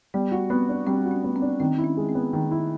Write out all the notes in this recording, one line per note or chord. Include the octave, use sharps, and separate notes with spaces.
G3 B3
F#4
B3 C4
D4
G3 C4
F#4
C#4
B3
C4
D4
D#3 C4
E4
C#4
G#3
C4
B3
D#3
E4